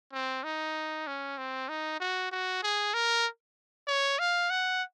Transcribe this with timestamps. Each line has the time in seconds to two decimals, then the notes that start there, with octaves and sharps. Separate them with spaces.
0.13 C4
0.44 D#4
1.07 C#4
1.38 C4
1.69 D#4
2.00 F#4
2.32 F#4
2.63 G#4
2.94 A#4
3.88 C#5
4.19 F5
4.50 F#5